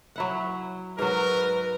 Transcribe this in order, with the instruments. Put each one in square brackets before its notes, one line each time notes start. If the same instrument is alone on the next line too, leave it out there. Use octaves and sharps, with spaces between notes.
[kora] F#3 E4 F#5
[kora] G#2 F#3 [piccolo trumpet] A#4 [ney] B4